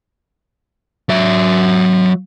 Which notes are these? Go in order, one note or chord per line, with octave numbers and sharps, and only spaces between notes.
F#3 E5